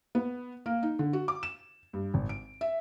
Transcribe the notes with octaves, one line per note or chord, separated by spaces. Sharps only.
B3
A#3
D#4
D3
F#4
D6
E7
G2
G#1
D7
E5